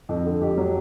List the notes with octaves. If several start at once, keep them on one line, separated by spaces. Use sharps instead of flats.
F2
D3
F2 G4
F#3